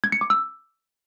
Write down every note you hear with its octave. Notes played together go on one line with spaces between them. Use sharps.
G#6
C#7
D6
E6